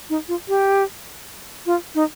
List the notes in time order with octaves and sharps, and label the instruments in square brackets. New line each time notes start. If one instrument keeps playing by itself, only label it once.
[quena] D#4
F4
G4
F4
D#4